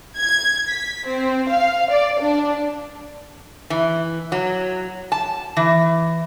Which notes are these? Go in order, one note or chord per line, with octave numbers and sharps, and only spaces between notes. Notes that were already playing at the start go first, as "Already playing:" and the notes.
G#6
B6
C4
F5
D5
D4
E3
F#3
A5
E3